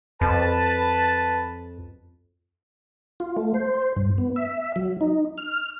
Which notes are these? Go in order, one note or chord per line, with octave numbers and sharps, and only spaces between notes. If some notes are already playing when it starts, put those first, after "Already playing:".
F2 B4 A5
F4
A3
C5
G2
B3
E5
F#3
D#4
F6